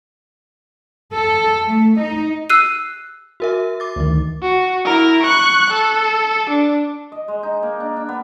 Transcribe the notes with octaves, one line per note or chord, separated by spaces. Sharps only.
A4
A3
D#4
E6 F#6 C7 D#7
F#4 A#4 E5
D6 A6
D2 D#3
F#4
E4 A#4
C#6 F#6
A4
D4
D#5
G#3
D#4
A#3
D4
D4
B3